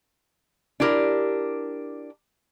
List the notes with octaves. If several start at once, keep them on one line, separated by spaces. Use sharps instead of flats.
D4 E4 G4 A#4